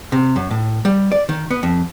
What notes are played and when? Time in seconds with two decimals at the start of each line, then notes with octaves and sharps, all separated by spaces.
0.12 C3
0.36 F#2
0.51 A2
0.85 G3
1.12 D5
1.29 D#3
1.51 B3
1.63 F2